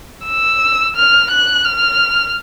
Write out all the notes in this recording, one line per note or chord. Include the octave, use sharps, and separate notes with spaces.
E6
F6
F#6
F6